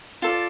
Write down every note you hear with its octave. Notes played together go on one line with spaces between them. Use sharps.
F4 A4 D5